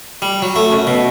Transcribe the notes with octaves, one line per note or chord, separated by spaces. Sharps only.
G3
F#3
A3
F#2
B2